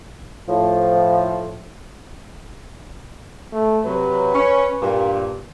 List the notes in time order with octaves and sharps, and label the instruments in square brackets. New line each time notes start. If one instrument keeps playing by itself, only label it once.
[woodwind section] A2 F3
[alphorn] A3
[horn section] C3 F#3 [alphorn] B4
[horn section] C#4
G2 A#2